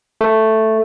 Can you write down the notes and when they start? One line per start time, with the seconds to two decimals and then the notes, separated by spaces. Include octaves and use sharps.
0.21 A3